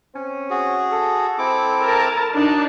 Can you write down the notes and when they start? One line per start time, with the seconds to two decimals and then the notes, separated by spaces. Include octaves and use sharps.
0.14 C4 C#4
0.50 F#4 G#4
0.92 A4
1.38 C4 E4 D6
1.82 A#4 A5
2.35 F#2 D4 D#4 A5